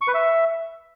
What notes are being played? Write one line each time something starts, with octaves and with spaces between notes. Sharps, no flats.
C#6
B4
E5